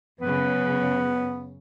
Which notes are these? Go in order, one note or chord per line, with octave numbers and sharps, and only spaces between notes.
F#2 C#3 B3 B4